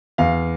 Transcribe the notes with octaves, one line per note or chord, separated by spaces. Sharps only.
E2 F5